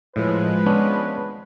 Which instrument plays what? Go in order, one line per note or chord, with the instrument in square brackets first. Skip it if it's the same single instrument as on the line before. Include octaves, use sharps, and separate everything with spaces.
[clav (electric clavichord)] A2 [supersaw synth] F3 G#3 [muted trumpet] B4
[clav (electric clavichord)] B3 C#4 D4